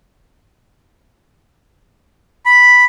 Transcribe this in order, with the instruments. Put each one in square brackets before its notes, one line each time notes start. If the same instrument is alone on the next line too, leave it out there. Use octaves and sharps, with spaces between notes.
[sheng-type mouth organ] B5